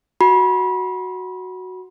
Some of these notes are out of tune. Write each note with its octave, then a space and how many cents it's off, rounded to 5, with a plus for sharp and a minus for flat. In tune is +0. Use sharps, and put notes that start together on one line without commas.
F#4 +0 B5 -30